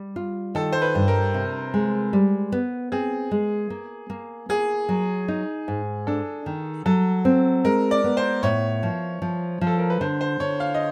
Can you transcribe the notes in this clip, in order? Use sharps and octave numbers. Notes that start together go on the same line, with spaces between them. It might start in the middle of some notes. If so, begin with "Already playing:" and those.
Already playing: G3
F4
D#3 A4
C5
B4
G2
A#4
C3
G#3
G3
B3
C4 G#4
G#3
A#3
A#3
A#3 G#4
F#3
D#4
G#2
D4 A4
D#3
F#3 A4
C4
G#3 A#4
D5
B3
C5
A2 C#5
F3
F3
F3
A4
A#4
B4
D3 C5
C5
D3 C#5
F5
D#5